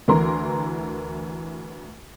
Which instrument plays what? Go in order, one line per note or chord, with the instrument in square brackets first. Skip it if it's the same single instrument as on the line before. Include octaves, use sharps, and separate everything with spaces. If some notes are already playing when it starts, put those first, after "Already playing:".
[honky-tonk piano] D2 E3 A#4 C6